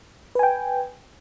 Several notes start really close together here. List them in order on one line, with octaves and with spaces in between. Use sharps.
B4 G#5 G5